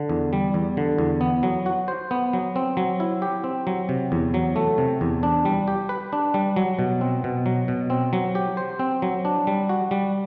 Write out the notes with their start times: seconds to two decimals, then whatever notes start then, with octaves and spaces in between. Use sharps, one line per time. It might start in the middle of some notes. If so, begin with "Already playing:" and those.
Already playing: D3
0.09 E2
0.33 G3
0.54 E2
0.77 D3
0.98 E2
1.21 B3
1.43 F#3
1.66 F#4
1.88 C5
2.11 B3
2.33 F#3
2.56 C4
2.77 F#3
3.00 E4
3.22 G4
3.44 C4
3.67 F#3
3.89 C3
4.12 E2
4.34 F#3
4.56 A3
4.78 C3
5.01 E2
5.23 D4
5.45 G3
5.68 G4
5.89 B4
6.13 D4
6.34 G3
6.56 F#3
6.79 B2
7.01 C4
7.24 B2
7.46 F#3
7.68 B2
7.90 C4
8.13 F#3
8.35 G4
8.57 C5
8.79 C4
9.02 F#3
9.25 D4
9.47 G3
9.69 F#4
9.91 G3